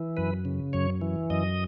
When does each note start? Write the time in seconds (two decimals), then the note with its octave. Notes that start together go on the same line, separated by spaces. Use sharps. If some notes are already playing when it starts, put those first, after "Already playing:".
Already playing: E3
0.17 F#2 B4
0.45 C#3
0.73 F#2 C#5
1.01 E3
1.30 F#2 D#5